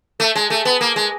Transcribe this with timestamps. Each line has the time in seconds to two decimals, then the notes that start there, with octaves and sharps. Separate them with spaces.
0.20 A3
0.35 G#3
0.50 A3
0.65 B3
0.81 A#3
0.96 G#3